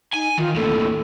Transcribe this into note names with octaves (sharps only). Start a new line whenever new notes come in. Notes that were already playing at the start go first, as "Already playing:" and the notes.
D#4 G#5
D#3 F4
D#2 A2 A4